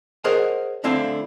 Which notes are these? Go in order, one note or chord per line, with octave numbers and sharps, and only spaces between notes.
G#4 A#4 C5 C#5 D#5 F#5
D3 A3 C4 E4 F5 G#5